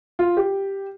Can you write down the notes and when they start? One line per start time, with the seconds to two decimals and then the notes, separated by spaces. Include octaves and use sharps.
0.19 F4
0.37 G4